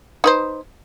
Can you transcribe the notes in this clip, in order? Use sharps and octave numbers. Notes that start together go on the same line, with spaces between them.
D#4 B4 C5